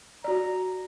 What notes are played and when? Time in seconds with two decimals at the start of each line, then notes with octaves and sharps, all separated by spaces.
0.24 F#4 D5 A#5